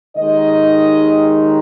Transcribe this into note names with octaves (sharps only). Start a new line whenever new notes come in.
D#2 D#3 G#3 D#4 D#5